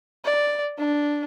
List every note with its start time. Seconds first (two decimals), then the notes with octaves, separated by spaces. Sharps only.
0.25 D5
0.78 D4